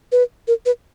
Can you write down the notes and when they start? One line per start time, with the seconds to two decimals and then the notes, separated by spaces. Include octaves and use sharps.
0.12 B4
0.48 A#4
0.66 B4